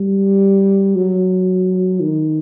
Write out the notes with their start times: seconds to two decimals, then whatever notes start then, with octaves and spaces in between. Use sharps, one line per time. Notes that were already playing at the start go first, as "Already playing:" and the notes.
Already playing: G3
0.96 F#3
2.00 D#3